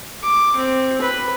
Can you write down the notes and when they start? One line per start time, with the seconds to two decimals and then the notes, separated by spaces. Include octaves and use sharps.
0.23 D6
0.56 C4
1.01 B4